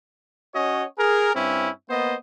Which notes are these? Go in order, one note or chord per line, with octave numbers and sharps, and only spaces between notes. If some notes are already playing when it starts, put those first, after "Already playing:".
C#4 F#4 C#5 D#5
G#4 A#4
G2 C4 C#4 E4
A#3 B3 C5 D#5